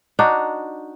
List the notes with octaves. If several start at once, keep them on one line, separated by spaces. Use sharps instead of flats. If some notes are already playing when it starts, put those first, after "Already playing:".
D4 D#4 F#4